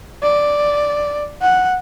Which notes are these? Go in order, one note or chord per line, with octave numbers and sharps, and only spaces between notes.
D5
F#5